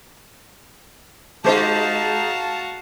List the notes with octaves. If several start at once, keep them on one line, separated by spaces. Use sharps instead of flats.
G#3 D#4 F#4 G4 C5 F5 A5